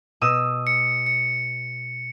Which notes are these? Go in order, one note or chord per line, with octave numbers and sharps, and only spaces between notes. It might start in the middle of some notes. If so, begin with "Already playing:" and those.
B2 D#6 E6
C#7
C#7